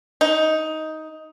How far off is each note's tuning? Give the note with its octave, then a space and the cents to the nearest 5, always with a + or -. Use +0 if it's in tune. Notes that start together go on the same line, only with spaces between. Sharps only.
D#4 +10